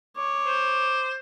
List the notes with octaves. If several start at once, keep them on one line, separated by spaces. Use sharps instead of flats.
C#5 D6
C5